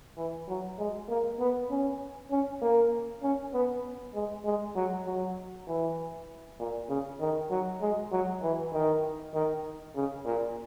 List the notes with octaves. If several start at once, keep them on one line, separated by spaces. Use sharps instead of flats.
E3
F#3
G#3
A#3
B3
C#4
C#4
A#3
C#4
B3
G#3
G#3
F#3
F#3
E3
A#2
C#3
D#3
F#3
G#3
F#3
E3
D#3
D#3
C#3
A#2